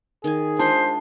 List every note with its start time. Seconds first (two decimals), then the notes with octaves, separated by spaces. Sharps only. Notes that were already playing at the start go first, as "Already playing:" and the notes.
0.24 D#3 G#4 G#5
0.59 G#3 D4 F4 C5 A5